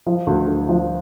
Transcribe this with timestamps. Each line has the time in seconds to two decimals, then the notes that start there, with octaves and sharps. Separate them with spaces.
0.06 F3
0.27 D2
0.47 D2
0.69 F3